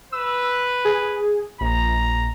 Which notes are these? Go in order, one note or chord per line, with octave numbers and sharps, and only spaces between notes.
B4 E6
G#4
A#1 A#5